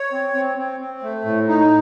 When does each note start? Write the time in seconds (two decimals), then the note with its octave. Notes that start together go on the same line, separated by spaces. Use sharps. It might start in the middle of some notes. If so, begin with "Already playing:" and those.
Already playing: C#5
0.12 C4
0.34 C4
0.58 C4
0.80 C4
1.03 A3
1.25 A2
1.48 D#4